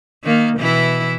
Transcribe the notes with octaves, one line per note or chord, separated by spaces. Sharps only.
D#3 A#3
B2 E3 E4